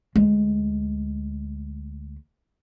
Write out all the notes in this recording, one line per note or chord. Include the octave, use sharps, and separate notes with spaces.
D2 G#3